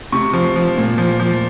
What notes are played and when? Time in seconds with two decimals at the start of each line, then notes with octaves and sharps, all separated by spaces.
0.12 C3 C#6
0.33 F3
0.56 F3
0.77 A#2
0.98 F3
1.20 F3